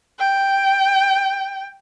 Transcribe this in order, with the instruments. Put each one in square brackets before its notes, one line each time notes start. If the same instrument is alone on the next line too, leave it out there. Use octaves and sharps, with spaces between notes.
[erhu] G5